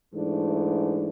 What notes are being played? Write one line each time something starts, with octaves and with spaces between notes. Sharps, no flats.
G#2 E3 A3 D4